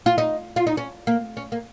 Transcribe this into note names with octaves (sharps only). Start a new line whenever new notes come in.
F4
D#4
F4
D#4
C#4
A#3
C#4
A#3